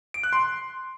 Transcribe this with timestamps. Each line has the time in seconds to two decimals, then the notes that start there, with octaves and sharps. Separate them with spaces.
0.14 D7
0.23 F#6
0.33 C6